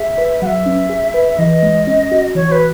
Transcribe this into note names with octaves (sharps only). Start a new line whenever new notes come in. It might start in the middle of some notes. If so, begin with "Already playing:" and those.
Already playing: G#4 E5
B4
F#3 E5 F#5
C#4
G#4
B4
E5
E3 D#5
G#3
C#4
F#4
E3 C#5
B4